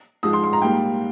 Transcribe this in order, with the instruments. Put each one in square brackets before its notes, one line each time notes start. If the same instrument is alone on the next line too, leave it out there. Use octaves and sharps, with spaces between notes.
[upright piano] G#2 F3 G#3 D#6
C6
C6
A#5
G#2 G3 A#3 G5